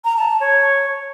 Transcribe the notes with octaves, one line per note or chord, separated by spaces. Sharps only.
A#5
A5
A5
C#5